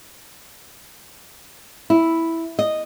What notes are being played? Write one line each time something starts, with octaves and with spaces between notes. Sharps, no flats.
E4
D#5